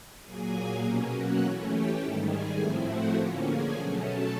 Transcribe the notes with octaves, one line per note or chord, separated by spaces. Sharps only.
A#2 F#3 A#3 G#4 G#5
B2 F#3 A#3 C#4 G4 G5
F#4 F#5
E3 A3 C#4
G4 G5
G#2 D#3 G3 A4 A5
G#4 G#5
A2 F3 A3 C4 E4 G#4 G#5
F#4 F#5
D3 F3 A#3 C#4 G4 G5
G#4 G#5
B2 F#3 A3 C#4 G#4 G#5
A4 A5